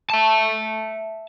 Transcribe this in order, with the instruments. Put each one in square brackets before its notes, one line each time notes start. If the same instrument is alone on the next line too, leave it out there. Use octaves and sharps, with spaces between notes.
[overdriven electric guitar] E5 A5